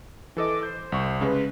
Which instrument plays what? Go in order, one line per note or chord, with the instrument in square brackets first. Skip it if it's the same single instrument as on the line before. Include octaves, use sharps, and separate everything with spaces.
[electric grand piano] E3 A4 D#5 [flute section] D6
[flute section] C5 [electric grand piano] G6
[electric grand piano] C2 C#6
[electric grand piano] C#3 G#3 [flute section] B4